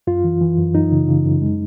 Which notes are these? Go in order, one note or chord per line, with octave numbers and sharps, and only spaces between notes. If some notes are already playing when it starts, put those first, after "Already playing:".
F#2 F4
E3
E3
F#2
F#2 D#4
C#3
C#3
F#2
G#3